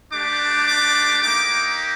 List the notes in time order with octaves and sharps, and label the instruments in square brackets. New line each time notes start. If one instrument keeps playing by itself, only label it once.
[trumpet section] A3 D4 G4 D6
D6
A#3 D#4 G4 D6